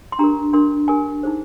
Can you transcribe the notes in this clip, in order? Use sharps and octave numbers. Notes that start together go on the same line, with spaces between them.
C6
D4 G4 A#4 A#5
D4 G4 A#4 C6
D4 G4 A#4 G#5
D#4 G#4 C5